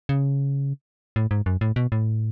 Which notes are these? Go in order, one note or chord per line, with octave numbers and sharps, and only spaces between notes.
C#3
A2
G#2
F#2
A2
B2
A2